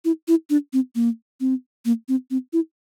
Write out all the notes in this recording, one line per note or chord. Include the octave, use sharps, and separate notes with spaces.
E4
E4
D4
C4
A#3
C4
A#3
C4
C4
E4